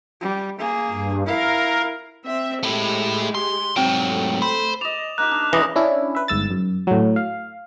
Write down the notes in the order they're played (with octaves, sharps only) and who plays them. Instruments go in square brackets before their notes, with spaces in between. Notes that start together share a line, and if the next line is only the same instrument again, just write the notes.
[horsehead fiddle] G3
A#3 G#4
[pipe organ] G2
[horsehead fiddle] E4 F5 [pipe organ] A#4
[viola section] C4 E5
[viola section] G#3 G4 [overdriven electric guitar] A3 E4
[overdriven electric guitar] C6
[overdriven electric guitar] G#2 F#3 [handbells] C4 G5 D7
[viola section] A3
[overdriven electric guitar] C5 [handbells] B5
[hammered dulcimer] D5 D#5 [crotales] E7 F7
[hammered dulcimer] A#3 D#4 G4 [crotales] F#6
[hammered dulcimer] D4
[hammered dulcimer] C#3 G#3 [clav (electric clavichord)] E3 [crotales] D6 D#6 A#6
[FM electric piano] C#4 D4 E4
B4 E5
G1 G#2 E6 A6
F#2
A2 F#3
F5